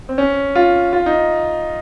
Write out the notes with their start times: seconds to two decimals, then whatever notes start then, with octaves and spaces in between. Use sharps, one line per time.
0.09 C4
0.18 C#4
0.55 F4
0.93 F4
1.06 D#4